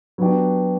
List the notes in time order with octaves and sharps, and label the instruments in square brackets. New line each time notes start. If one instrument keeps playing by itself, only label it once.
[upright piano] F#3 B3 D4 G4